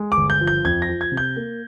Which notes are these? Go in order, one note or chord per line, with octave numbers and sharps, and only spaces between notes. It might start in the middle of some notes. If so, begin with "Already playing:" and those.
Already playing: G#3
D6
G1
G6
F3
G6
F2 G#6
A#6
F3
G#6
C3
G6
A#3